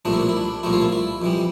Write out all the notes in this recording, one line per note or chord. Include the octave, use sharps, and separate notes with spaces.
C2 A#2 F3 A3 D4
E4
D4
E4
D4
C2 A#2 F3 A3 E4
F4
E4
E4
F2 E3 G3